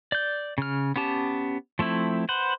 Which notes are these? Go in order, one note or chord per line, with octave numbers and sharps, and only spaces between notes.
D5 G6
C#3 F6
B3 C#4 G4 A5
F3 A3 C4 E4
B4 C5 F#5